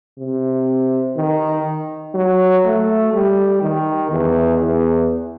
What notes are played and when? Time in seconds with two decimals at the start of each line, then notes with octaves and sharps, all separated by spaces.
0.19 C3
1.17 D#3
2.14 F#3
2.65 A3
3.13 G3
3.62 D#3
4.11 E2
4.61 E2